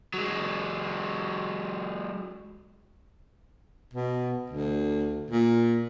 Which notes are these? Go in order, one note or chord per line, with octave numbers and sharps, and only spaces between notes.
F#3 G#3
B2
D2
A#2